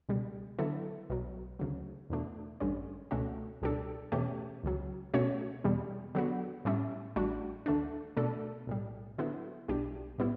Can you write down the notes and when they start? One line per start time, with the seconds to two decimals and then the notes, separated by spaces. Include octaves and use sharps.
0.09 C#2 B2 G3
0.59 D3 F#3 B3 E4 A4
1.10 B1 B2 F#3
1.59 D2 C#3 F#3
2.10 E2 B2 A3 D4
2.60 A1 G2 D3 G3 C#4
3.11 C#2 B2 A3 C#4 F#4
3.62 C#2 B2 G3 D4 A4
4.12 E2 B2 A3 C#4 G4
4.64 C#2 C#3 F#3
5.14 B2 A3 C#4 F#4 C#5
5.64 E2 B2 G3
6.15 D3 F#3 B3 F#4
6.65 A2 G3 C#4 E4
7.16 A1 A2 G3 D4 F#4
7.66 D2 D3 A3 D4
8.17 B2 A3 D4 A4
8.67 B1 A2 G3
9.18 D3 F#3 B3 E4
9.68 B1 B2 G3 D4 G4
10.18 A2 G3 B3 E4